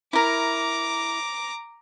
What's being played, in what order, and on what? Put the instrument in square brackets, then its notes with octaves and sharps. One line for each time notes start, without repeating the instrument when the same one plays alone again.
[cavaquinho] E4 A#4 [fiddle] A#5 D6